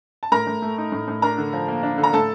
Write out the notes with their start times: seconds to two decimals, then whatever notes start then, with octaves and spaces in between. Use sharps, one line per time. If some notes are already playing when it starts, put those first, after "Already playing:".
0.23 A5
0.32 A2 A#4 A#5
0.47 A2
0.62 A3
0.78 D#4
0.92 A2
1.08 A2
1.22 D4 A#4 A#5
1.38 D3
1.53 F3
1.68 A#3
1.83 D4
1.98 D3
2.04 A#5
2.13 A2 A4 A5